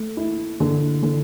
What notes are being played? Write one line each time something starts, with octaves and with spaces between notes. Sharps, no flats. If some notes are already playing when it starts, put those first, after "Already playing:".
Already playing: A3
E4
D3
D3